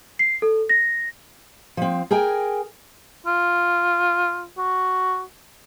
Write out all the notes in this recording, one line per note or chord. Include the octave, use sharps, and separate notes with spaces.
C7
A4
A#6
F3 C4
G#4 A#4 G5 G#5
F4
F#4